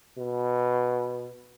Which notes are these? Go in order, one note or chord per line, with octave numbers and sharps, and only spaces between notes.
B2